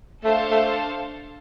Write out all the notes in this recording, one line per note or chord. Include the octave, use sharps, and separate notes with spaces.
A3 D4 A4 C5 F5 A5
A3